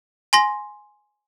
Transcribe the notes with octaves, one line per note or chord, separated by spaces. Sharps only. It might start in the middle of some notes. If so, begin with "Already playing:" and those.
G#5 C6 A#6